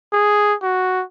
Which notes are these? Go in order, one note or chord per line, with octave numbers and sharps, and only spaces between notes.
G#4
F#4